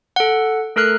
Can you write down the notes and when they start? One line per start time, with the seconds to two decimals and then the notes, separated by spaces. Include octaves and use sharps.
0.16 A4 F#5
0.76 A3 A4 A#4 F6 F#6